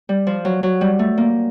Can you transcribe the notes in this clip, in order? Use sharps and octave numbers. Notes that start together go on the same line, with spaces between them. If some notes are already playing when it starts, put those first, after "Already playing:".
G3
F3
F#3
F#3
G3
A3
A#3